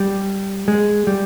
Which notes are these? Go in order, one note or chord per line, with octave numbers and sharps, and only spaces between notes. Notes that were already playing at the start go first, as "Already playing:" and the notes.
Already playing: G3
G#3
G3